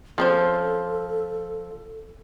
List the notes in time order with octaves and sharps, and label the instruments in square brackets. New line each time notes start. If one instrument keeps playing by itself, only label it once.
[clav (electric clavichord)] F3 [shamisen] C4 C#4 C5 [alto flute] A4